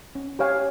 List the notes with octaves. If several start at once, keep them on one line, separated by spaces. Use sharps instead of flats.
C#4
G4 C#5 F5 G#5